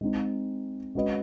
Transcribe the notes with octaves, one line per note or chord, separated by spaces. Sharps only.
G#3 C4 D#4
G#3 C#4 F#4 B4 D#5